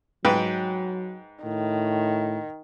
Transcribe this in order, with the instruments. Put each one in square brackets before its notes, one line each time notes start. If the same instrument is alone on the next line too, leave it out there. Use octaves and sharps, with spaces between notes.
[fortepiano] G#2 B4 G5 [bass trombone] F#3
[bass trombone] A2 [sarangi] D#3